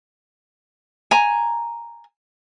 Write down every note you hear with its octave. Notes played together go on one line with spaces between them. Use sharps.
G#5 A#5